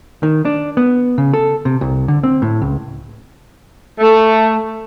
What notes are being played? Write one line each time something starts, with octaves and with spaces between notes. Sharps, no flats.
D#3
D4
B3
C#3
A4
C3
C2
D3
C4
A2
C#2
A3